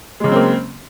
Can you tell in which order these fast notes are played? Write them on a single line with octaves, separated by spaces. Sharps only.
G#3 C#3 F#3 C4 A#3